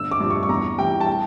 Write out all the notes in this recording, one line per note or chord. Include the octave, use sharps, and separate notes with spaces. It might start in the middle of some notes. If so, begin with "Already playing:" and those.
Already playing: G1 E6
D6
G2 F3
C#6
C#6
E2 A#5
E3 G3 G5
A5
G5